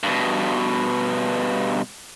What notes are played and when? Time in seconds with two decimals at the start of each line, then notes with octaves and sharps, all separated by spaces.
0.03 G2 B2